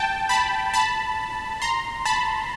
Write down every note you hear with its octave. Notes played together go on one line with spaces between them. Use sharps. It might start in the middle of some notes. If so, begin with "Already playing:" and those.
Already playing: G5 A5
A5 B5
A5 B5
A#5 C6
A5 B5